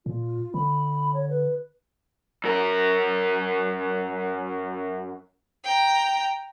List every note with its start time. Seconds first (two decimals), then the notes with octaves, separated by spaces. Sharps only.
0.06 A#2 F4
0.54 D3 B5
1.14 C#5
1.30 B4
2.44 F#2 A#4
5.64 G5 A#5